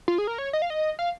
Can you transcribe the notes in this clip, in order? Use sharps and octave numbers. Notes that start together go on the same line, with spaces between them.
F4
G#4
A#4
C#5
D#5
F5
D#5
F5